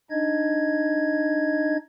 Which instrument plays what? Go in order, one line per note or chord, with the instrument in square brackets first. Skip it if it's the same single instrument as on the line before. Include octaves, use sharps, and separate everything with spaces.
[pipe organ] D4 D#4 D#5 G#6